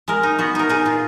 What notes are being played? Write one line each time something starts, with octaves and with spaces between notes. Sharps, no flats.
G#3 A#4
D#4
B3 F#4
D#4 A#4
D#4 G#4
A#2 F4